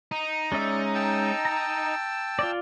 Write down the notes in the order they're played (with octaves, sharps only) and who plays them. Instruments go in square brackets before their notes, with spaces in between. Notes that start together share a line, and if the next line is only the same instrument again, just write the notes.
[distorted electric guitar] D#4
[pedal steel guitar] G#3 C#4 E5 [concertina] D5
[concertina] G5 A5 E6
[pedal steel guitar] A#5
F4 D5